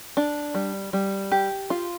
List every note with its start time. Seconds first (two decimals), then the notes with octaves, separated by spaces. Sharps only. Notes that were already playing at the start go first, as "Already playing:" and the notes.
0.17 D4
0.55 G3
0.93 G3
1.32 G4
1.70 F4